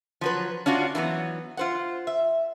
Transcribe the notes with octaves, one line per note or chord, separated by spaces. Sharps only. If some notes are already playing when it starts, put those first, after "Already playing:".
F3 F#3 B4
C#4 D4 F4 F#4
E3 F#3 G#3 B3
F4 C5 F#5
E5